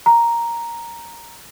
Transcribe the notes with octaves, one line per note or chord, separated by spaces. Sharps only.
A#5